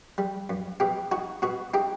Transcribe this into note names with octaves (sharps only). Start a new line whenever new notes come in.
G3
F#2
B2 G4
D#4 F#4
B2 F#4
D#4 G4